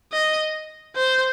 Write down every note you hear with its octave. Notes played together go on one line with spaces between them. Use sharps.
D#5
C5